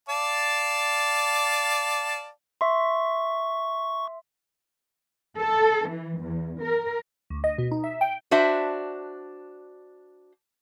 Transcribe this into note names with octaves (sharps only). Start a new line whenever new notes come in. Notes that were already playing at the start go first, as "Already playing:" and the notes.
D5 F5 A5
E5 C6 C#6
A4
E3
E2
A#4
D2
D#5
B2
D#4
E5
G5
D4 F#4 C5 E5